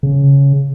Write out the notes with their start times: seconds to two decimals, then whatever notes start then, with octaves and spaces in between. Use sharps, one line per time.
0.03 C#3